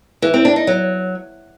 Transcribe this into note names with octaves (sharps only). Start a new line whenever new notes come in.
E3
C4
D4
D#4
F#3